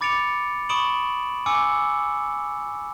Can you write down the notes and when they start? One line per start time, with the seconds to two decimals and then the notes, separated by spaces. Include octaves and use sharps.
0.01 B5 D6 A6 C#7 D7 F7
0.69 B5 C#6 D#6 D7 E7 F#7
1.46 G#5 D6 E6 C#7